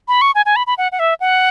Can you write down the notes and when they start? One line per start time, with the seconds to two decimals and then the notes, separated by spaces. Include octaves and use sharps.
0.08 B5
0.21 C#6
0.35 G#5
0.46 G#5
0.56 B5
0.67 B5
0.78 F#5
0.92 F#5
0.99 E5
1.20 F#5